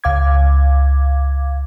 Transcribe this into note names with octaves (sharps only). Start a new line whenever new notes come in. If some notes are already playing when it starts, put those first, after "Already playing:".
C#2 F5 D6 G#6